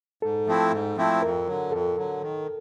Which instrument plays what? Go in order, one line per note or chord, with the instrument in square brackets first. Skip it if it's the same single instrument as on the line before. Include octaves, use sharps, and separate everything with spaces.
[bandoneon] G#2 [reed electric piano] A4
[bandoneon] F3 A3 C4 E4
G#2
F3 A3 C4 E4
[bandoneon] F2 [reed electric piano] A#4
[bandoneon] D3 F#3
[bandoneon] F2 [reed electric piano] A4
[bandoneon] D3 F#3
D#3